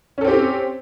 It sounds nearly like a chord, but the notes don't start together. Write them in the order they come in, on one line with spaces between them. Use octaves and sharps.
C#4 A4 C4 G4